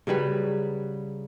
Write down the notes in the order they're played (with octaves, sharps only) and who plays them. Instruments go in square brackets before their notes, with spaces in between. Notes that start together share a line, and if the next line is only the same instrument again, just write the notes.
[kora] C#3 F#3 G3 B4